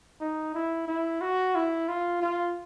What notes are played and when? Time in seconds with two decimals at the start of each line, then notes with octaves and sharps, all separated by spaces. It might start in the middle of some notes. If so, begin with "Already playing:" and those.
0.21 D#4
0.55 E4
0.88 E4
1.21 F#4
1.55 E4
1.88 F4
2.22 F4